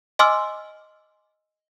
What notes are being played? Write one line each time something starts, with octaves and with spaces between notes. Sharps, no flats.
D#5 G#5 C6 D6 E6 F6